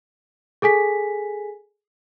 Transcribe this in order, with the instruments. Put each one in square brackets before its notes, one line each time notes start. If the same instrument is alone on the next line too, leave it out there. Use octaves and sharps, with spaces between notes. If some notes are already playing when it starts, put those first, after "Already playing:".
[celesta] G#4 A4 G#5 B6